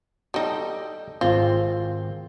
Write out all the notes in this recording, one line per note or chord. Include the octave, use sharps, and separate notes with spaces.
G3 D#4 A4 G5
G#1 C4 F4